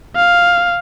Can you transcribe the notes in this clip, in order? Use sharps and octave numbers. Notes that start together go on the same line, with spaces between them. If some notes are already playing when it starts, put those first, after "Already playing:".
F5